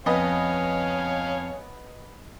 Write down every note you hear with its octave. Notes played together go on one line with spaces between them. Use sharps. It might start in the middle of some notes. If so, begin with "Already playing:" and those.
F2 B3 C#5 D#5 F5 G#5